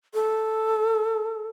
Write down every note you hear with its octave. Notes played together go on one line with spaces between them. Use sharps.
A4